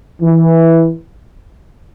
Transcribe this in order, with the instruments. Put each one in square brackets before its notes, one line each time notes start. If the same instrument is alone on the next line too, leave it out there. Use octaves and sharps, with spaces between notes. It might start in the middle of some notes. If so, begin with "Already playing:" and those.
[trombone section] E3